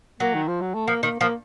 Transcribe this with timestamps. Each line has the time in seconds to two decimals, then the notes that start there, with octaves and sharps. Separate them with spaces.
0.20 F#3 A#3
0.34 D#3
0.48 F3
0.61 F#3
0.74 A3
0.87 F3 A#3
1.03 D#3 A#3
1.19 F3 A#3